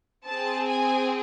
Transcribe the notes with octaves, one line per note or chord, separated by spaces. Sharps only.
C4 G#4 A5
G#5